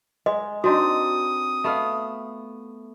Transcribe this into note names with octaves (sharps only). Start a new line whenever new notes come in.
G#3 D#5
C4 D4 D#4 F#4 D#6
A3 B3 F5